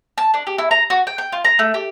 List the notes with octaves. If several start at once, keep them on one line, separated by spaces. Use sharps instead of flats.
A5
D4
G4
E4
A#5
F#4
G5
G5
F4
A#5
A3
G4